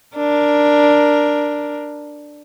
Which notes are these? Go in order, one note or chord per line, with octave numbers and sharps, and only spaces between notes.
D4 A#4